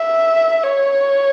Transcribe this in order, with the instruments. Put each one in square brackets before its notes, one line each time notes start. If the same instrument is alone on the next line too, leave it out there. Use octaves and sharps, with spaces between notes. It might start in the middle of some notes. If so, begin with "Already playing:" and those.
Already playing: [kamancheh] E5
C#5